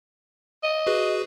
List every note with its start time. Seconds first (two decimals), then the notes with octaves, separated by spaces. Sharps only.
0.63 D#5
0.87 F#4 G#4 B4